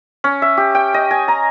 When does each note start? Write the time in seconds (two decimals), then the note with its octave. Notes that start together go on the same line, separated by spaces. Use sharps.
0.24 C#4
0.42 E5
0.57 G4
0.75 G5
0.94 D#5
1.11 G#5
1.28 A#5